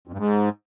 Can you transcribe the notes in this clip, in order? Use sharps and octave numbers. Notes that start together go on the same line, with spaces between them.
F2
G2
G#2